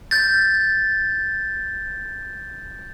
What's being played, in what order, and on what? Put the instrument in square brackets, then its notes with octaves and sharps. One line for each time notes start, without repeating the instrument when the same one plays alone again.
[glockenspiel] G6 A6